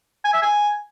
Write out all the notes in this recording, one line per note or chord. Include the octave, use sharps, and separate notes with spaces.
G#5
E5
G#5